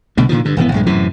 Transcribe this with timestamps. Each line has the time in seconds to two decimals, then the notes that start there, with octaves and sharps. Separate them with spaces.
0.17 C2 B2 D3 A3
0.29 A#2 D3 D#3 F3
0.45 G2 D3
0.57 D#1 G#1 E3 B3
0.72 A#1 G2 G#3
0.86 F#2 A2 C3 E3